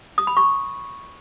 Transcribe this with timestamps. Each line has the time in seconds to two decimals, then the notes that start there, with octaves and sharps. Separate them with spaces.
0.18 D#6
0.27 B5
0.37 C#6